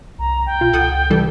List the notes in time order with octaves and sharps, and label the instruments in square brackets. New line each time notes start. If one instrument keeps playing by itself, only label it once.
[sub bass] C2 [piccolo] A#5
[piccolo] G5
[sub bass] B2 [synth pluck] F4
[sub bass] C#2 [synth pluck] A4 F#5 D#6
[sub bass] C3 [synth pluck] E3 G3 A4